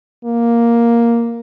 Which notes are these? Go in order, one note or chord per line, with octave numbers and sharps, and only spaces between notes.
A#3